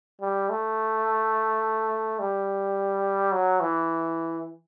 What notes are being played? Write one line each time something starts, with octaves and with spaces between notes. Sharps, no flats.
G3
A3
G3
F#3
E3